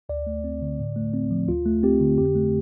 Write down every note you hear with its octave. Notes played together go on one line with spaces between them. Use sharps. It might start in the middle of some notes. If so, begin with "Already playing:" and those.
D2 D5
A3
C4
D3
A2
A3
C4
F3
D2 F4
A3
C4 G4
D3
F2 G4
A3